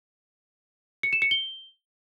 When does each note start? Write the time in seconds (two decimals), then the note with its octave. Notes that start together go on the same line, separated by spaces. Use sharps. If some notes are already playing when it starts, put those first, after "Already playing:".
1.03 C#7
1.13 E7
1.22 C#7
1.31 G7